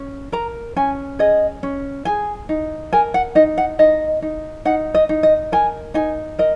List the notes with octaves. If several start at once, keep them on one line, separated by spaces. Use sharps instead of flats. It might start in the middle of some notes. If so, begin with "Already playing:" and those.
Already playing: C#4
A#4 A#5
C#4 G#5
G#4 D#5
C#4
G#4 G#5
D#4
A#4 G#5
F#5
D#4 D#5
F#5
D#4 D#5
D#4
D#4 F#5
D#5
D#4
D#5
A#4 G#5
D#4 G#5
A#4 D#5